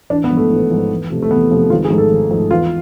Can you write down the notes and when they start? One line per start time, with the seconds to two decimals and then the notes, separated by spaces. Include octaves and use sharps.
0.10 A1 D4
0.24 B3
0.31 G#2 F3
0.37 A3
0.50 A1
0.70 G#2 F3
0.90 E2
1.11 C3 F3 A3
1.23 A3
1.31 E2 B3
1.51 C3 F3 A3
1.70 G#1 F4
1.85 G#4
1.90 G#2 F3 A3
1.98 A4
2.11 G#1
2.31 G#2 F3 A3
2.50 E2 F4